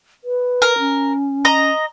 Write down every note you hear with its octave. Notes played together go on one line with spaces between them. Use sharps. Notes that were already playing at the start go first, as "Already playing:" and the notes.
B4
A#4
C#4
D#5 A#5